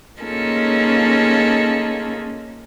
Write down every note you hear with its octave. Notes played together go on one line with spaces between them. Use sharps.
A#3 C#4 D#4 F4 G#4 A4